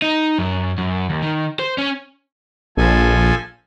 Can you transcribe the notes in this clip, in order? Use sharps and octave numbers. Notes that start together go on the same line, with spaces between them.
D#4
F#2
F#2
D#2
D#3
C5
C#4
A#1 F3 A4 G#5